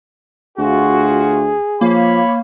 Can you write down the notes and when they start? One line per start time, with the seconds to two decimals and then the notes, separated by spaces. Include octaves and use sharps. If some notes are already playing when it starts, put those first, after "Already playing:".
0.58 D2 F4 F#4 G#4
1.81 F3 A#3 C#5 F5 B5